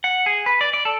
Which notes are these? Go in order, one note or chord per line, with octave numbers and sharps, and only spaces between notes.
F#5
G#4
B4
D5
D5
A4